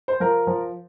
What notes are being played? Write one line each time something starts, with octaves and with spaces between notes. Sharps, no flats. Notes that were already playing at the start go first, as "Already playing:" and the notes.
C5
F3 A#4
F3